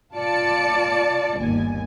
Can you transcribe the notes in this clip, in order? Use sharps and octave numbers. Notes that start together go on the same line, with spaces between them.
F4 D5 A5 C#7
G1 D#2 G#5